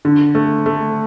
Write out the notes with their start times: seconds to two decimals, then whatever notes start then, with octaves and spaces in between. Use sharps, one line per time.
0.05 D3
0.35 A3
0.66 A3